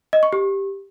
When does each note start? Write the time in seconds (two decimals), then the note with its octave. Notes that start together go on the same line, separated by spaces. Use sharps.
0.13 D#5
0.23 C#6
0.33 G4